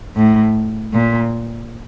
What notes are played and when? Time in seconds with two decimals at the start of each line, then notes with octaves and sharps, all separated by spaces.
0.16 A2
0.93 A#2